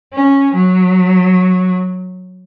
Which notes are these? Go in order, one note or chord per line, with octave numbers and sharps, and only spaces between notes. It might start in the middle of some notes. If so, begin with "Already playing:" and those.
C#4
F#3